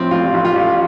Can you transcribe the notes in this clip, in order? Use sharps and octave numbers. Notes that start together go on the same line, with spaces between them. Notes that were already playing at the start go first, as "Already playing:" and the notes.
Already playing: A2 F3 C4
A1 F4
A1
F4
A1